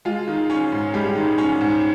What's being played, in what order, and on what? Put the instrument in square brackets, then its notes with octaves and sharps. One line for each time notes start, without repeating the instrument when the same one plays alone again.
[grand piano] G#3 F4
D#3
C#4
G#2
G3 G#3 G4
D#3
C#4
G#2